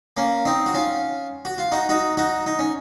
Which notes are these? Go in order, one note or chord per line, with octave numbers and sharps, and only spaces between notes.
A#3 C#4
C4 D#4
F#4
C#4 F4
F#4
F4
D#4 F#4
D#4 F#4
D#4 F#4
D#4
C#4